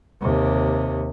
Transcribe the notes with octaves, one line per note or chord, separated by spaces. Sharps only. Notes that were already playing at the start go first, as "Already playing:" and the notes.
D#2 C3